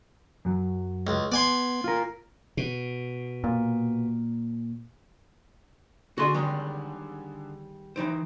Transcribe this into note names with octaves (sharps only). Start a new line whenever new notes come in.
F#2 F#3
C#2
B3 D5 G#5 C6
F4 A#4
B2
A#2
D3 F#4 G#4 D5 C6
D#3 G3 G#3
E3 D#4 C5 D7